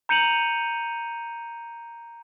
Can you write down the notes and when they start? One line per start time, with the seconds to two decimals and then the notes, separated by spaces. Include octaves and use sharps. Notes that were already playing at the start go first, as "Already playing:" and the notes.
0.09 A#5 G6 C#7 D#7 F7 F#7